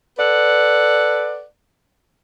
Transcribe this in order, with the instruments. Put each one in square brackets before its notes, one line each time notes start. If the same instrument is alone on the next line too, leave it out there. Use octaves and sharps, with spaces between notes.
[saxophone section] A4 B4 D5 F#5